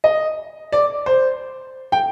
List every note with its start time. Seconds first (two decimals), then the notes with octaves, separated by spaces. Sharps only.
0.04 D#5
0.72 D5
1.06 C5
1.92 G5